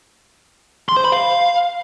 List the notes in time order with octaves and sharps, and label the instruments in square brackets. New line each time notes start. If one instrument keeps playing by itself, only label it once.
[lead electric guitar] C6
C5
B5
F5